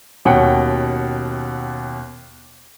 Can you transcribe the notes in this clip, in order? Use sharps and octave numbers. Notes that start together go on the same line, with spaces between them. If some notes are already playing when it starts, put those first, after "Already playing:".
D#2 B2 C#4 F#5 G5 C#7